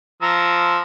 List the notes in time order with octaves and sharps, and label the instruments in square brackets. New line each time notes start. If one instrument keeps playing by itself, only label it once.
[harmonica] F3 A#5 E6